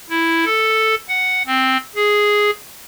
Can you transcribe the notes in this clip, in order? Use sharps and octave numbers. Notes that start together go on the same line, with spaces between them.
E4
A4
F#5
C4
G#4